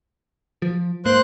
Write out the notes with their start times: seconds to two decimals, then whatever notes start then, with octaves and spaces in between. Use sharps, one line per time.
0.62 F3
1.05 G#2 A#3 C5 C6 F#6